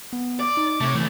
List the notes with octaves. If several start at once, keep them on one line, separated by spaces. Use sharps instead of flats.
B3
D5 D6
D#4
C3 A3 C#5
C#3 E3 A3